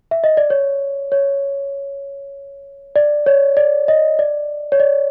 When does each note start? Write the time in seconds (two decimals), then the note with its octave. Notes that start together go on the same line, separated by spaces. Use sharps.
0.11 E5
0.24 D#5
0.37 D5
0.50 C#5
1.12 C#5
2.96 D5
3.26 C#5
3.57 D5
3.88 D#5
4.19 D5
4.72 C#5
4.80 D5